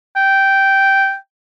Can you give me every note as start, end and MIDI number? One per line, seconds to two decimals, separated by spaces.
0.16 1.15 79